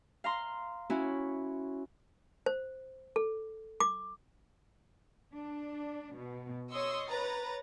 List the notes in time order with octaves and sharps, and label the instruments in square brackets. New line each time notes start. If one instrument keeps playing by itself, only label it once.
[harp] F5 A#5 C6
C#4 E4 F#4
[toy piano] C5
A4
D6
[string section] D4
B2
C#5 D#5 C6 C#6 D#6 E6
B4 C#5 A#5 A6